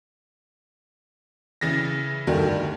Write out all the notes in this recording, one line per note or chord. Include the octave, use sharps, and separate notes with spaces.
C#3 E3 A6 A#6
D2 G2 D3 D#3